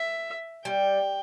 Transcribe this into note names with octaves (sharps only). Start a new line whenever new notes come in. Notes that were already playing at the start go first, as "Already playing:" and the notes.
Already playing: E5
G3 G5